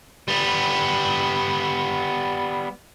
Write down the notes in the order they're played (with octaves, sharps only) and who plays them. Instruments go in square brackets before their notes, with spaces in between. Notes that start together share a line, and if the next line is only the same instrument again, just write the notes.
[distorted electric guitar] G3 B3